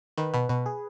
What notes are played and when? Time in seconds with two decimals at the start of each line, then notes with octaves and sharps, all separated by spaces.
0.18 D#3 B4
0.34 B2 B4
0.49 B2 B4
0.66 G#4